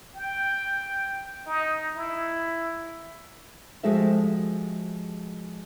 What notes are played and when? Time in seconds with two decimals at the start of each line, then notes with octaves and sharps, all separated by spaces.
0.16 G5
1.47 D#4
1.96 E4
3.83 F3 G#3 F#4 G4 A4 E5